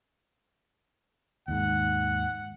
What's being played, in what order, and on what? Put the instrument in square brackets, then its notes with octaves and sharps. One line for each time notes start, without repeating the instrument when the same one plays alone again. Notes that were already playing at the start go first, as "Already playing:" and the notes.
[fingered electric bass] D#2 G#2 [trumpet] F#5